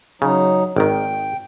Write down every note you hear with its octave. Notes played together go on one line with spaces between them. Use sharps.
C#3 F#3 D#4
G#1 D#3 G5